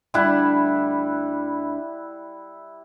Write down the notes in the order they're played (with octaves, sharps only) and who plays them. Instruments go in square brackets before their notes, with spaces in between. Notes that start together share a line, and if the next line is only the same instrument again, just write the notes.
[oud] D2 D4 [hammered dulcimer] G3 E4 F#5